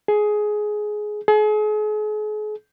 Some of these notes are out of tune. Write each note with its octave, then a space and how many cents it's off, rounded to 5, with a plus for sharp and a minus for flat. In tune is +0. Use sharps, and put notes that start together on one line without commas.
G#4 +15
G#4 +40